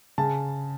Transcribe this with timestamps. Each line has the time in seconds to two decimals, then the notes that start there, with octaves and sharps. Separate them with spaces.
0.18 C#3 A5